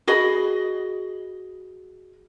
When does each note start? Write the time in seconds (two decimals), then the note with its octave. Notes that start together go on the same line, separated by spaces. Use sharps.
0.07 F#4 G#4 D#5 B5